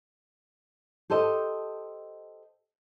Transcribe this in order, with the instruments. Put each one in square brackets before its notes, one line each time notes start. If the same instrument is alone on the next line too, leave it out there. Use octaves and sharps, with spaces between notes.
[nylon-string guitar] G4 A4 C5 D#5